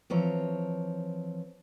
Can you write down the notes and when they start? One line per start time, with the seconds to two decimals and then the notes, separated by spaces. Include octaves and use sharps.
0.10 E3 F3 C4 C#5 A#5